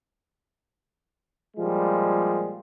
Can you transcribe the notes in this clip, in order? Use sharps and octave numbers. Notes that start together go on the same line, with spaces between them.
A#2 F3 G3 G#3